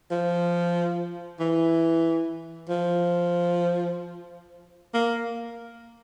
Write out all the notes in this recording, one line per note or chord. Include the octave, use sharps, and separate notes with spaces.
F3
E3
F3
A#3